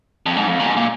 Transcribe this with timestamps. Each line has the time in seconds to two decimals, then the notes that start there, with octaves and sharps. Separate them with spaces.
0.26 F2
0.38 G#2
0.48 F2
0.60 A#2
0.66 G#2
0.77 A#2